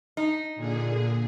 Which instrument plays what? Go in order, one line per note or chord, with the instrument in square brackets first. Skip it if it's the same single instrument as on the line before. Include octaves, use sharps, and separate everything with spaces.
[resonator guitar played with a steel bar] D#4
[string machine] A#2 D3 G#4